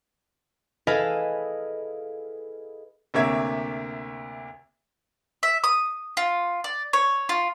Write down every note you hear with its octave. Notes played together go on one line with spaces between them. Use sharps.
E4 G#4 A4 B4 D#5 F5
D2 C3 A#3 C#5 E5 G#6
E5
D#6
F4
D5
C#5
F4